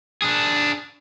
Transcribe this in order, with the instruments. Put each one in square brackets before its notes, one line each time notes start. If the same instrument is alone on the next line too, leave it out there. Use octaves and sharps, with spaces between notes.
[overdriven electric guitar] D4 G#4